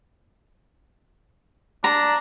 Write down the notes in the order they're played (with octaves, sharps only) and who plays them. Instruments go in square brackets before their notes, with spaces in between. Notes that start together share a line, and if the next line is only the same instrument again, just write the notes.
[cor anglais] D4 [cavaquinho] A#5